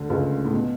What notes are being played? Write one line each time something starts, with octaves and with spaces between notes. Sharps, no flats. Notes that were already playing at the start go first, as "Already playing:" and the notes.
Already playing: D2 D3
C#2 C#3
A2
B2